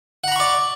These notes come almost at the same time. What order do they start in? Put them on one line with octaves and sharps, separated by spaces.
F#5 A#5 B5 C#6 D5